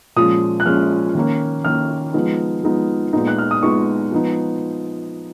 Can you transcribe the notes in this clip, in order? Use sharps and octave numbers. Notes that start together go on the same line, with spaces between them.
A#2 F3 G#3 C#4 D#6
F#6
A#2 F3 G#3 C#4 F6
D#3 A#3 C#4
D#3 A#3 C#4 F6
F3 G#3 B3 D#4
F3 G#3 B3 D#4
A#2 G#3 B3 D#4
F#6
F6
D#6
A#2 G#3 B3 D#4 C#6
F3 G#3 B3 D#4